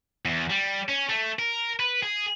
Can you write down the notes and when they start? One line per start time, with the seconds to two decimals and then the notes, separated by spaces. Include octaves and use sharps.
0.25 E2
0.50 G3
0.89 C#4
1.09 A3
1.39 A#4
1.80 B4
2.03 G#4